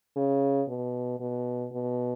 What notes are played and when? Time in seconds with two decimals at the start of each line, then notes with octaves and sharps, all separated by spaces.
0.16 C#3
0.68 B2
1.20 B2
1.72 B2